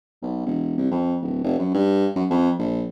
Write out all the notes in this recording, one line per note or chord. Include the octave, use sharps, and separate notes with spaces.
B1
E1
C2
F2
D1
F1
F#2
G2
F#2
F2
A#1